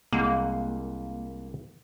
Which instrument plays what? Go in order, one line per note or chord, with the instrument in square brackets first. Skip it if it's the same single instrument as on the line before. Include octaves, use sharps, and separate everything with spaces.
[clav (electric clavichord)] C2 G#3 F#5 [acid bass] A#3